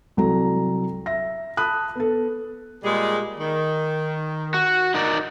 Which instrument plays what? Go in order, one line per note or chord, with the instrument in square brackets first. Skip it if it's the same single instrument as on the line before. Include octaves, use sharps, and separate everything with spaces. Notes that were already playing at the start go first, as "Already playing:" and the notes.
[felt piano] C2 F#3 A4 A#5
E5 A#6
A5 B5 D#6 F#6
B3 A4
[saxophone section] A#2 G3 G#3
D#3
[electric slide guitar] F#4
D#4 A#4 D5